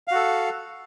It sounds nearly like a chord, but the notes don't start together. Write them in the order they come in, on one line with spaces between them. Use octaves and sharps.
F5 F#4 A4